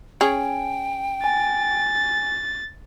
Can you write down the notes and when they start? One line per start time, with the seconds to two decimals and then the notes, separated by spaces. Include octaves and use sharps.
0.21 C#4 G#4 G5
1.24 G#5 A6